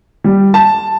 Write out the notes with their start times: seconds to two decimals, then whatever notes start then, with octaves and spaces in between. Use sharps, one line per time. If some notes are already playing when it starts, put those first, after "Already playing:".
0.24 G3
0.54 A5